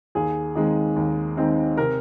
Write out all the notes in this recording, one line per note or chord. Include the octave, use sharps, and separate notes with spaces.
D#2 G#4
D#3 G#3 C4 D#4
D#2
D#3 G#3 C4 D#4
C3 A#4